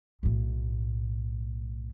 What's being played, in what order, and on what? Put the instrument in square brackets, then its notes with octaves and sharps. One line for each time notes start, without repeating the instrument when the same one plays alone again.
[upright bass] B1 A2